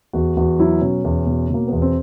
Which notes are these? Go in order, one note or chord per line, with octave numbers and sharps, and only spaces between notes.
E2 F#4
E2 F#4
F#3 E4
B2 C#4
E2
B2
B2 A#3
E2 B3
C4